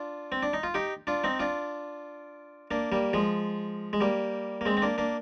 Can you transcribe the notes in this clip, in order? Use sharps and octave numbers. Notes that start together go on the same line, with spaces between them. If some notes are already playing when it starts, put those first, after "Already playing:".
Already playing: D4 F4
C4
D4
D#4
F4
D#4 G4
D4 F4
C4 D#4
D4 F4
A#3 D4
G3 A#3
F3 G#3
G#3
G3 A#3
A#3
G#3 C4
C4
A#3 D4
A#3 D4